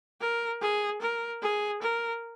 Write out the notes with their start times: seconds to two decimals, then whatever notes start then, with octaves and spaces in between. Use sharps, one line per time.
0.21 A#4
0.61 G#4
1.01 A#4
1.42 G#4
1.82 A#4